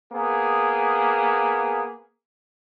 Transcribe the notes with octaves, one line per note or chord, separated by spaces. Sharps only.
A#3 B3 G#4